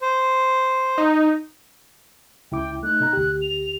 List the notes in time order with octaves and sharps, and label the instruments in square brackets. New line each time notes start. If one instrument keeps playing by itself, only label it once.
[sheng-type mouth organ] C5
[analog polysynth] D#4
[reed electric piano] C#2 E4 D6 [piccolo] G5
[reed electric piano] A3 D#4 [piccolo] F#6
[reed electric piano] B2 D#4 A#5
D2 G4
[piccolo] F7